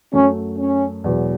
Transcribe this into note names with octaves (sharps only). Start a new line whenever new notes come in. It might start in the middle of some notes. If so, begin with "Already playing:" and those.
F#2 F#3 A3 C#4
C#4
E1 E2 B2 F#3 B3